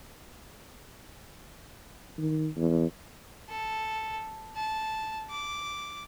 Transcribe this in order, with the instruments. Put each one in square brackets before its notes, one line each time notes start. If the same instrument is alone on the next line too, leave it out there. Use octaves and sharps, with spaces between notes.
[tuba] D#3
E2
[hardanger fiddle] A4
A5
D6